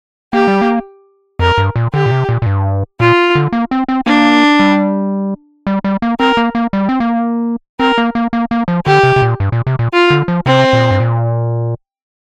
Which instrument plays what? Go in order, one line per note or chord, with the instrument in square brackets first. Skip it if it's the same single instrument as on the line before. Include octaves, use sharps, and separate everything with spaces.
[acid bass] A#3 [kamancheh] G4
[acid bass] G3
A#3
[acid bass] F2 [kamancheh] A#4
[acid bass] G2
A#2
[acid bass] D3 [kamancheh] G4
[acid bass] A#2
C3
A#2
A#2
G2
[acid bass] A#2 [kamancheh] F4
[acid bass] D3
A#3
C4
C4
[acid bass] A#3 [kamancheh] D4
[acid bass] G3
G3
G3
A#3
[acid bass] C4 [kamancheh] A#4
[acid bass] A#3
A#3
G3
C4
A#3
[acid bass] C4 [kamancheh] A#4
[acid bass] A#3
A#3
A#3
A#3
F3
[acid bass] D3 [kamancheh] G4
[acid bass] C3
C3
A#2
G2
A#2
C3
A#2
[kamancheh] F4
[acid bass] D3
F3
[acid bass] C3 [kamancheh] C4
[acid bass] A#2
G2
A#2